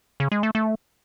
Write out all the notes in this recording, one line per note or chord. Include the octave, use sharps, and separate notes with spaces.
C#3
G#3
A3
A3